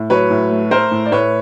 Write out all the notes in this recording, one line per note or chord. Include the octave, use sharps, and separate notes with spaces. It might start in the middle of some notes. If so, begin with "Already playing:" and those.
Already playing: A2
F#3 B4 C#5
A2
A3
A3 A#4 C5
A2
D5
A2 B4 C#5